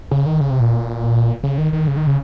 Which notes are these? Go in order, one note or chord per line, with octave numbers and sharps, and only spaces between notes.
C#3
D#3
C#3
C3
A#2
C#3
D#3
D#3
C#3
D#3
C#3